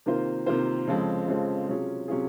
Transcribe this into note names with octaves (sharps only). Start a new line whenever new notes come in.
C3 D#3 A#3 F4 C5
C3 D#3 A#3 F4 C5
F2 C#3 F3 G#3 C4
F2 C#3 F3 G#3 C4
C3 F#3 C#4 F4 G#4
C3 F#3 C#4 F4 G#4